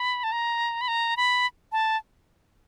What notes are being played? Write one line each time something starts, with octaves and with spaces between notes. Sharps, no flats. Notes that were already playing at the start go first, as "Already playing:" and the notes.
Already playing: B5
A5
A#5
B5
A#5
B5
A5